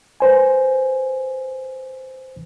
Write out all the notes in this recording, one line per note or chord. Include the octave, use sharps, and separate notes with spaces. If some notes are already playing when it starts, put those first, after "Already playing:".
B4 C5 G#5